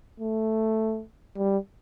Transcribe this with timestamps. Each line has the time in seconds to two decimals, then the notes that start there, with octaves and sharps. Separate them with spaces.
0.20 A3
1.37 G3